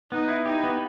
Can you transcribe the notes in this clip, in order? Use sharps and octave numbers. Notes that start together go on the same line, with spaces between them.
B3 D#4
E4
D#4 G4
B3